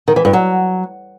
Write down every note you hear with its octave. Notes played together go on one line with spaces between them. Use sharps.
D#3
E3
G2
F#3